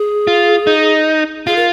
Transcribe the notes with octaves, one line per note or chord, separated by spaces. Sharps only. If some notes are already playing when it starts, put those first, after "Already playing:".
Already playing: G#4
F4
D#4
F4 G#4
A#4